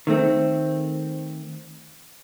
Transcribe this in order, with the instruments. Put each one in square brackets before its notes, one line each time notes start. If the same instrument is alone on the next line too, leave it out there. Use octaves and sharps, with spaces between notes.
[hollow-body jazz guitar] D#3 A3 C4